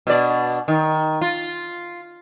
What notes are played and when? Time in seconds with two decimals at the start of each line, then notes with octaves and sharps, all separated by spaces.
0.07 B2 D4 D5
0.68 D#3
1.21 F4